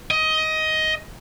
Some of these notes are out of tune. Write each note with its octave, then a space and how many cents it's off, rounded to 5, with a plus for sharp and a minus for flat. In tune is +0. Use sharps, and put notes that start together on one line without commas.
D#5 +15